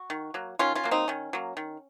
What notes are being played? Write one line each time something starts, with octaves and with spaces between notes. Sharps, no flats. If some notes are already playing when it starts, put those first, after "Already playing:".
Already playing: F#4
D#3
F#3 A#3
D#3 C#4 F4
C#4 F4
F#3 A#3
C4 D#4
D#3 C#4
F#3 A#3
D#3